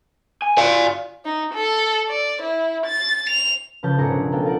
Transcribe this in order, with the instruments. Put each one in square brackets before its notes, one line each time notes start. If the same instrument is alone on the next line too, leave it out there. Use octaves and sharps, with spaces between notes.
[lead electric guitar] G#5
[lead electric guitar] F#4 F5 [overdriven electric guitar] D5 G#5
[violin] D#4
A4
D5
E4
A6
F7
[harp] C#3 F3 C#4 B4 A5 G6
B1 G#2 G#4 A#4 A#6 C#7
D3
B3 A4 F5 G5
F4 A#4 F#5